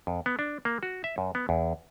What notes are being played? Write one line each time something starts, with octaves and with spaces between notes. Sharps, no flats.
F2
B3
D4
A#3
F#4
E5
F#2
B3
E2